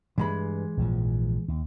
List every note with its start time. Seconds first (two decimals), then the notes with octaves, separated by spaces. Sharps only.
0.18 G2 E3 G#3 B5
0.77 A#1 G#2 F3
1.48 D#2